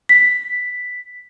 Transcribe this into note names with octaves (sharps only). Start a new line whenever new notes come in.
B6